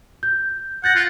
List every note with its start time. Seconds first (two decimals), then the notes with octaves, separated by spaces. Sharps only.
0.23 G6
0.84 F#5 G6 A6 A#6
0.96 F4